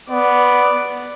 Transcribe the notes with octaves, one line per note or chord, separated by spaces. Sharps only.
B3 D5